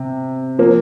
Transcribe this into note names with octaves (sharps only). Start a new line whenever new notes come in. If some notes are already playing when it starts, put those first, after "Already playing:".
Already playing: C3
F3 A#3